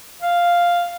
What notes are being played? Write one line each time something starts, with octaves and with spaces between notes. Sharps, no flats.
F5